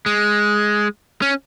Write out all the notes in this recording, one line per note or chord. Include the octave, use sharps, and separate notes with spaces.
G#3
C#4